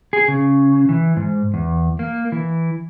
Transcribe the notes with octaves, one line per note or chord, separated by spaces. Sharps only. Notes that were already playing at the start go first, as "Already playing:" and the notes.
G#4
C#3
E3
G#2
E2
A#3
E3